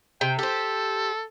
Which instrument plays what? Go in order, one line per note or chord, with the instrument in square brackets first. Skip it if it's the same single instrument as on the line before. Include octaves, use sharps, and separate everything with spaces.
[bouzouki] C3 [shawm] G5
[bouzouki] G4 C5 [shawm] A4